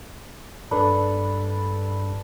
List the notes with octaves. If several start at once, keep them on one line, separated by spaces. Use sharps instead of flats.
G2 D4 A4 B4